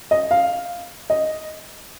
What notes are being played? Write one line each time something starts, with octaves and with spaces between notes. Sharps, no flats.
D#5
F5
D#5